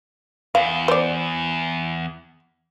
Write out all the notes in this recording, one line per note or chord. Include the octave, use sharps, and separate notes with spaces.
E2 F5
C5 D5